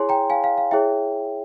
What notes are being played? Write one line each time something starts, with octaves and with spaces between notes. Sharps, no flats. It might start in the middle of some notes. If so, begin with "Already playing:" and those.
Already playing: E4 G#4 C#5 G#5 C6
G5 A#5
F5 G#5
F5
F5
E4 G#4 C#5 E5 G5